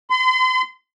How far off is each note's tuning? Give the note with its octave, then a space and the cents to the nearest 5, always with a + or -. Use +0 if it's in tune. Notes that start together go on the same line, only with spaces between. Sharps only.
C6 -40